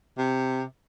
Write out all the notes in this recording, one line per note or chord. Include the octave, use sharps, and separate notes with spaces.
C3